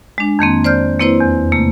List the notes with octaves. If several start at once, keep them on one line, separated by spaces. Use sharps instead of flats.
G#3 D4
F2 D#3 A#3 C4
C5 D5 F6 G6
A#3 C4 E4 B4 C5
E2
C3 A3 A#3